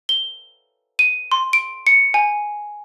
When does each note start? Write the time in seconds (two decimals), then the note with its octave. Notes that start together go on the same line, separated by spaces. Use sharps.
0.09 G7
0.99 D#7
1.32 C6
1.53 D7
1.87 C#7
2.14 G#5